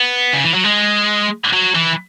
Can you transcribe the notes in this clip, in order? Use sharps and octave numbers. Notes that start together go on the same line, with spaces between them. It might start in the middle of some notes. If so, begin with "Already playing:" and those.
Already playing: B3
C#3
E3
F#3
G#3
F#3
E3